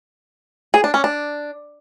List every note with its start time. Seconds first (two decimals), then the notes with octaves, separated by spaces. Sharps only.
0.74 G#4
0.84 D4
0.94 C#4
1.04 D4